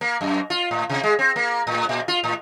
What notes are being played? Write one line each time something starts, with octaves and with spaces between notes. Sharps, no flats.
A#3
F#2
F4
A2
C3
G#3
C4
A#3
A2
A#2
F4
A2